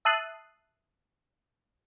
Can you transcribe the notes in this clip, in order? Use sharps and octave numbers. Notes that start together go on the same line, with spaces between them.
E5 A5 D#6 F#6 C7